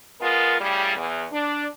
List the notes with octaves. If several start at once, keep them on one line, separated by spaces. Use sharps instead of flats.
G#3 B3 F4 A#4
A2 C#3 G3
E2
D4